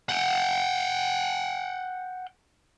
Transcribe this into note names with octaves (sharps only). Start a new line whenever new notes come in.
F#5 G5